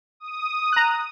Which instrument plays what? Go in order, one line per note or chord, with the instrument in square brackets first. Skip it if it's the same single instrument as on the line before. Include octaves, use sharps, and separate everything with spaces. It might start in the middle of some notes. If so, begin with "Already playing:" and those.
[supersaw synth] D#6
[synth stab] A#5 F#6